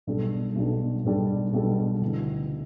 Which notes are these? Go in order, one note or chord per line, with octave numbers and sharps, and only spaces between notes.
B1 B2 G3 D4 A4
B1 B2 G3 D4 A4
B1 B2 G3 D4 A4
B1 B2 G3 D4 A4
D2 C#3 E3 B3